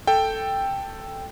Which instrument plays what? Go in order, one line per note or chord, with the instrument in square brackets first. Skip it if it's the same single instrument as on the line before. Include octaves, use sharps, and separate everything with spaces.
[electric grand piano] A4 G5